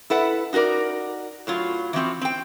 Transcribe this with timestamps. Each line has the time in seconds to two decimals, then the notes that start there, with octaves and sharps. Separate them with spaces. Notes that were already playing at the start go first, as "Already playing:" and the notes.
0.10 E4 A4 B4 F#5
0.53 D#4 F#4 G#4 A#4 D5
1.47 A2 F#3 F4
1.93 E3 F3 C4 F#4
2.21 C4 G5